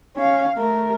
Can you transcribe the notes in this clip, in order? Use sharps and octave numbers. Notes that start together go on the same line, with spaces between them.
C#4 F5
A3 A#4